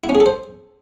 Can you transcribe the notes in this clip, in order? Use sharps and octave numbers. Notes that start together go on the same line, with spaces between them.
E4
C#4
G#4
A4
C5